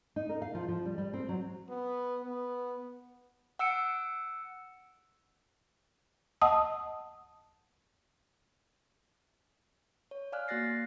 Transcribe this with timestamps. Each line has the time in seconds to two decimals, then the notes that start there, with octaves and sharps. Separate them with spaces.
0.16 D#4
0.29 A#4
0.42 F5
0.55 F3
0.68 F3
0.85 G3
0.98 G3
1.13 C4
1.29 F#3
1.70 B3
2.23 B3
3.59 F#5 E6 C#7 D7
6.41 D#5 F#5 A5 D#6 E6
10.11 C#5
10.32 D5 F5 G#5 F6 F#6
10.48 A#3 F#4 F#6 A6 A#6 C7